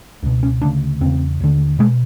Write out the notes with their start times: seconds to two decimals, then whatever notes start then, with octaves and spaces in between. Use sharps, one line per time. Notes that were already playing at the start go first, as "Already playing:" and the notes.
0.23 C#2 B2
0.43 C#4
0.62 D2 C#3 D4
1.01 E2 C#3 C4
1.40 D#2 D3
1.79 B2 G#3